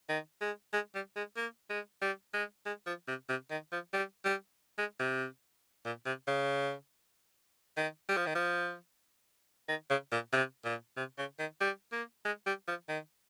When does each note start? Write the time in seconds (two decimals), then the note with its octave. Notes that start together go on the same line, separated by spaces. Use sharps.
0.09 D#3
0.41 G#3
0.73 G#3
0.95 G3
1.16 G#3
1.37 A#3
1.70 G#3
2.01 G3
2.34 G#3
2.66 G#3
2.86 F3
3.08 C3
3.29 C3
3.51 D#3
3.72 F3
3.93 G3
4.25 G3
4.78 G#3
5.00 C3
5.85 A#2
6.06 C3
6.27 C#3
7.77 D#3
8.09 G3
8.17 F3
8.26 D#3
8.35 F3
9.68 D#3
9.90 C#3
10.12 A#2
10.33 C3
10.65 A#2
10.97 C3
11.18 C#3
11.39 D#3
11.61 G3
11.92 A#3
12.25 G#3
12.46 G3
12.68 F3
12.89 D#3